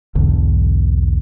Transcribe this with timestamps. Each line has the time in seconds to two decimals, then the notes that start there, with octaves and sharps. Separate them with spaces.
0.15 B1 E2 G#2 D3